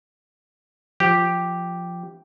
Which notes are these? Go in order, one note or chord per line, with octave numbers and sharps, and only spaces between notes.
F3 G4